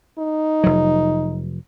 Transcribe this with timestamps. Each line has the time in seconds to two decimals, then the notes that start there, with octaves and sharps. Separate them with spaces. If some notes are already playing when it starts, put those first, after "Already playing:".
0.19 D#4
0.64 F1 F#3